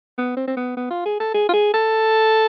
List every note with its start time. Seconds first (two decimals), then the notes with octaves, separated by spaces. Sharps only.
0.18 B3
0.37 C4
0.47 C4
0.57 B3
0.77 B3
0.91 F4
1.06 G#4
1.20 A4
1.34 G#4
1.49 F4
1.54 G#4
1.74 A4